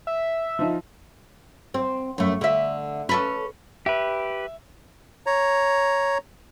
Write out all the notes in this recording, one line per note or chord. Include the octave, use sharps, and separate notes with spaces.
E5
F3 D#4
C4
F#2 A3
D3 E5
C#4 A4 B4
G4 B4 E5
C#5 A#5